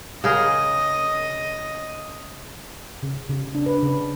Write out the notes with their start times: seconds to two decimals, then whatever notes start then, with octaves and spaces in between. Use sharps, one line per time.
0.24 C#3 G#4 A#4 D#5
3.03 C#3
3.29 C#3
3.55 D4
3.66 B4
3.83 C#3